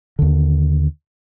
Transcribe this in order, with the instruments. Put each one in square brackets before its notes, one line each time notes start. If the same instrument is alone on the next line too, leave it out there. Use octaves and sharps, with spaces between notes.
[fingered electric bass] D#2 D3